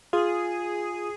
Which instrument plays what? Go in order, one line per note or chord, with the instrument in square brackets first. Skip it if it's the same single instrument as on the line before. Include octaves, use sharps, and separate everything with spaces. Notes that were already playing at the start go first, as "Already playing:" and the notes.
[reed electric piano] F4 [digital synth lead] G#4